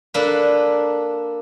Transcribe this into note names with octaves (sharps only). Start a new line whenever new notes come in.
A#3 D4 A4 B4